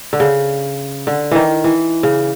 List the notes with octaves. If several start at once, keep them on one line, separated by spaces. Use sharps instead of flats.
D3
C#3
D3
D#3 E3
E3
C#3